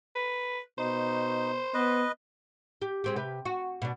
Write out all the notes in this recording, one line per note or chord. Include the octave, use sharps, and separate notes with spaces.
B4
B2 D#4 C5
B3 B4 D#5
G4
G#3 C4 G4
C3 G4 B4
F#4
B2 D4